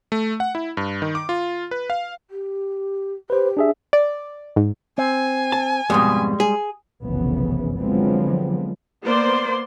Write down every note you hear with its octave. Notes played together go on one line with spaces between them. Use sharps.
A3
F#5
E4
G2
D#3
D6
F4
B4
F5
G4
G4 B4 C5
D4 G#4 E5
D5
G#2
C4 G#5
A5
F2 G#2 B2 G3 G#3
G#4
F1 B1 F#2 C#3 E3 B3
D3 F3 F#3 G#3 B3 C4
A#3 B3 C5 D5 C6